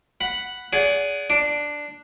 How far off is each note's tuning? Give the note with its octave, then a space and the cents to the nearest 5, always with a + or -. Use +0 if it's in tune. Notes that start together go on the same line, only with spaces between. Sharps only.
F#5 +0 B5 +0
G#4 +0 D5 -35 F#5 +0
D4 +0 D6 +0